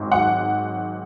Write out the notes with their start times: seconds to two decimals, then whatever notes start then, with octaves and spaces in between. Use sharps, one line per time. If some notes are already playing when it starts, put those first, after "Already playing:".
Already playing: G#1 G#2 F#3
0.12 F#5